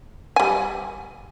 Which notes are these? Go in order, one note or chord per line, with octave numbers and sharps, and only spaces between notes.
G3 G#5